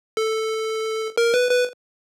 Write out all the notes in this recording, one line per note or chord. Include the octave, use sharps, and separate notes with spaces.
A4
A#4
B4
B4